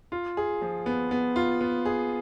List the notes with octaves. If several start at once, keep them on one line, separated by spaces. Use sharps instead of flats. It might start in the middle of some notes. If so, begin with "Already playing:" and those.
F4
G#4
F3
B3
B3
F4
B3
G#4